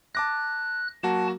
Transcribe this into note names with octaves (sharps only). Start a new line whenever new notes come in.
A5 D6 F#6 A#6
F#3 A#3 F#4 A5